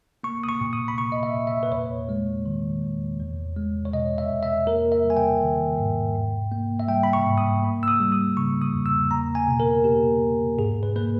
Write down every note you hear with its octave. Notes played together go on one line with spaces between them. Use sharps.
A#3 C#6
D#6
C#6
A#2
D#6
B5
A#3 C#6
D#5
E5
A#2
E5
B4
E2 C#5
G#3
D#3
E2
E2
G#3
C#5
B2 D#5
E5
E2
E5
A#3 A#4
E5
G3
G#5
G5
D#3
G#2
G#2
A#3
E5
G3 G5
B5
C#6
G#2
D#6
A#3
E6
D#6
G3
D#6
C#3 C#6
D#6
E2
E6
A#3 A#5
G#5
B2
A#4
A#3 G4
B2
G#2 G#4
B4
A#3 B4